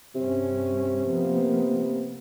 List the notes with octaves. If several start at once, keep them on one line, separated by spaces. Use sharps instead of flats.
G2 C3 C#4
F3 A#3 B3